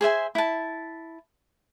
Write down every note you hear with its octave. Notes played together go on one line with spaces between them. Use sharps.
G#4 C5 E5 G#5
E4 A5